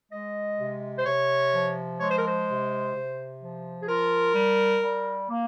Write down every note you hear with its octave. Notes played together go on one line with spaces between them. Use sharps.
G#3 D#5
C3
C5
C3 C#5
F3
G#3 C#5
C5
A#4
C5
C3
C3
F3
G#4
F4 A#4
G3
G3
A#3